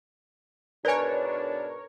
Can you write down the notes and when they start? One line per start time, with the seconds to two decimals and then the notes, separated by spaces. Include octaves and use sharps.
0.85 G#2 B2 D4 A#4 B4 C#5 D5 G#5